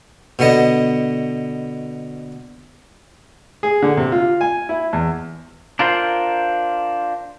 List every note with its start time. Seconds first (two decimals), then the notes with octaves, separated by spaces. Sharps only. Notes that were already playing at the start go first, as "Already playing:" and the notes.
0.39 B2 D3 B3 D#5
3.63 G#4
3.82 D3
3.97 C3
4.12 F4
4.41 G#5
4.69 E4
4.93 E2
5.79 D4 F4 A#4 C5